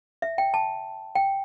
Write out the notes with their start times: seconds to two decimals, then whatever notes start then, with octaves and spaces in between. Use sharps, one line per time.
0.22 E5
0.38 G5
0.54 A5
1.15 G5